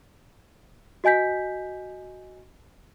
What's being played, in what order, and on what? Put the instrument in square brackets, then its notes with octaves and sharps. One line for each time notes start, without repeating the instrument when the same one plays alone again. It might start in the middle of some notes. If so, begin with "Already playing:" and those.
[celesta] F#4 D#5 G#5 G6 B6